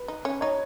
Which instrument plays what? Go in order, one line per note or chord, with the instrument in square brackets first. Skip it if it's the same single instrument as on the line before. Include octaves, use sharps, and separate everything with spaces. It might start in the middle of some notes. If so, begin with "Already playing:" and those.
Already playing: [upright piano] B4
[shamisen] D#4
C#4
[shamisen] D#4 [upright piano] C#5